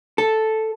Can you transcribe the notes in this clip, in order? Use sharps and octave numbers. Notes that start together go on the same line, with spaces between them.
A4